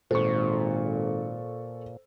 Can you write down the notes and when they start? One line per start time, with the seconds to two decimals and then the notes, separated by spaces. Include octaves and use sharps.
0.11 G#1 A#2 A4 C5 C#6